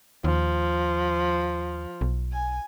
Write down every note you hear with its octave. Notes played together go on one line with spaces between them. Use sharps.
D#2 F3
B1
G#5